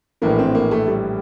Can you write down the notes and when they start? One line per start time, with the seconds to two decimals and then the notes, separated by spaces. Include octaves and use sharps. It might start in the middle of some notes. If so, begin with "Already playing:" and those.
0.22 A#1 A2 E3 A#3
0.39 C4
0.55 A#3
0.71 A3
0.87 G3